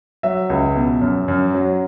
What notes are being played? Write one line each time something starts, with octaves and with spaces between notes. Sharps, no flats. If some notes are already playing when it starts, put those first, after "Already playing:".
F#3 E5
C#2
B2
F#2
F#2
F#3